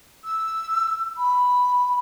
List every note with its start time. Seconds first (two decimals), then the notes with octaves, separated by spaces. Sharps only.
0.25 E6
1.18 B5